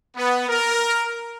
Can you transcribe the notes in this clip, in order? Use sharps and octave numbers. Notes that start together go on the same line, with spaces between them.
B3
A#4